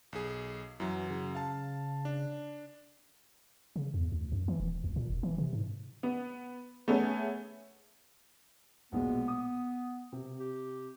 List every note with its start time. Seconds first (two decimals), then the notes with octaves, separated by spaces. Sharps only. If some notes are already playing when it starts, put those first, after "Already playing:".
0.13 B1 G#4
0.80 F#2 E3 F#3
1.10 C#3
1.35 F5 A5
2.05 D4
3.76 C#3
3.94 E2
4.12 D2
4.32 F#2
4.48 E3
4.60 D#1
4.84 C#2
4.96 A#2
5.10 E1
5.23 E3
5.38 C3
5.53 G#2
6.03 B3
6.88 A3 B3 C#4 G#4 E5
8.92 A#1 B2 G#3 B3
9.28 D#6
10.12 C3
10.40 G4